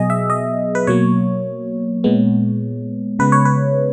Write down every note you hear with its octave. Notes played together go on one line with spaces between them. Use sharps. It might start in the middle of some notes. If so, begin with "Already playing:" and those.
Already playing: B2 F#3 B3 G#4 D#5
E5
D#5
B4
B2 F#3 A#3 C#5
A#2 G#3 B3
C#3 G#3 B3 B4
C#5
B4